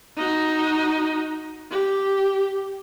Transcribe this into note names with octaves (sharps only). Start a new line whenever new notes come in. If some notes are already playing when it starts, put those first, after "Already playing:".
D#4 F#4
G4